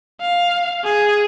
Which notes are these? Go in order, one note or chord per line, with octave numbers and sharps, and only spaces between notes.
F5
G#4